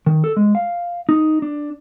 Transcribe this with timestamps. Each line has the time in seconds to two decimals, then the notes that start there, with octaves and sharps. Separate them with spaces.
0.06 D#3
0.24 A4
0.37 G#3
0.55 F5
1.09 D#4
1.42 D4